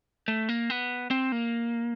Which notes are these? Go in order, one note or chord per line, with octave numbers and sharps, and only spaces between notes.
A3
A#3
B3
C4
A#3